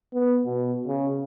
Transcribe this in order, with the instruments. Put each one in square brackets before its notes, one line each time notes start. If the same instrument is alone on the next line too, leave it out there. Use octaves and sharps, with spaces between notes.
[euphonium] B3
B2
C#3